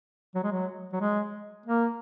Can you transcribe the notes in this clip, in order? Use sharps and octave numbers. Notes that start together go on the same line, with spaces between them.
F#3
G#3
F#3
F#3
G#3
A#3